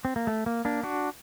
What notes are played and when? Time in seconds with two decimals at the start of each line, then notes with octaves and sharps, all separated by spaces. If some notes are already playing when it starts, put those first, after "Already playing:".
0.05 C4
0.16 A#3
0.27 A3
0.46 A#3
0.65 A#3 D4
0.83 D4 F#4